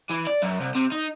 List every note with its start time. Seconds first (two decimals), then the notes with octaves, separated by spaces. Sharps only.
0.10 E3
0.27 D5
0.43 F#2
0.61 C2
0.75 C3
0.92 D#4